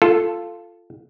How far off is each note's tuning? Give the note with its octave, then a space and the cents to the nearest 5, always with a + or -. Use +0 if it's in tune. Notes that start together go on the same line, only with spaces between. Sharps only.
F4 -5 A4 +0